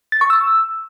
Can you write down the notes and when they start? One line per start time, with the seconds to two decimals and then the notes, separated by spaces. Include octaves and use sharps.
0.12 A6
0.21 C#6
0.30 E6